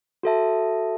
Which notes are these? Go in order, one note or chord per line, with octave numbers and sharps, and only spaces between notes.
F#4 A4 E5 A5